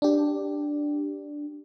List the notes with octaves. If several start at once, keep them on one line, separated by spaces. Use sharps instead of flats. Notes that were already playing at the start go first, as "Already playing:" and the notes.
D4 G4